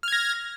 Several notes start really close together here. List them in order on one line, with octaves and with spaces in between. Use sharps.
F6 G#6 A#6